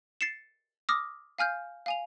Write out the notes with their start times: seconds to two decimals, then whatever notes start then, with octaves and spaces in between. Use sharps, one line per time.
0.21 A6 C7 C#7 E7
0.89 D6 D#6 F6 A#6
1.38 F5 G#5 F6 G6
1.86 F5 G#5 F7